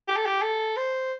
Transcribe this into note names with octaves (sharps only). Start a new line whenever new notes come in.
G4
A4
G4
A4
C5